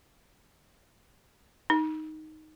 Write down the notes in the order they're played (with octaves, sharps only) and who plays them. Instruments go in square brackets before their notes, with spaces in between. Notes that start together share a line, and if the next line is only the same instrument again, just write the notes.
[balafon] D#4